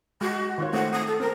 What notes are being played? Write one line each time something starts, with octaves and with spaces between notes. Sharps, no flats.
G#3 F#4
D#3 F4 C#5
A3 C4 F#5
D#6
A4
C4 A#4